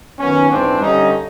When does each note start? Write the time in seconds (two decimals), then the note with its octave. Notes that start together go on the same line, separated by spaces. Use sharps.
0.19 F#2 D#3 B3 C#4
0.50 G#2 E3 C4 D4
0.80 G2 D3 C#4 D#4